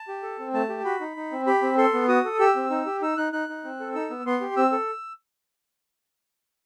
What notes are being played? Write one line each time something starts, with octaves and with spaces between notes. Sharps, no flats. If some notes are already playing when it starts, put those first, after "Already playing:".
Already playing: A5
G4
A4
C4
A3 A5
G4
F#4 B5
D#4
D#4
C4
G4 B5
C4
A4 C6
B3
F#4 D#6
A4
G4 E6
C4
D#4
G4
D#4 E6
D#4 F#6
D#4 F#6
D#4
C4
A4
D#4 E6
B3
B3 C6
G4
C4 E6
A4